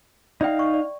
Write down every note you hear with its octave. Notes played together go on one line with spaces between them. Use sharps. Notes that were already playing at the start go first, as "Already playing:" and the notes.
D#4 D5 E5 F5 G5
D5 C#6
D5